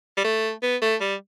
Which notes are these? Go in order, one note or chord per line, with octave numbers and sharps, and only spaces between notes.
G3
A3
B3
A3
G3